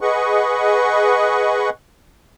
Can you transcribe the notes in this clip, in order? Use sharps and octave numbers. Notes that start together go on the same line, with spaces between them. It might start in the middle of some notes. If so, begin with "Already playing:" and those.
G#4 B4 D#5 F#5 C#6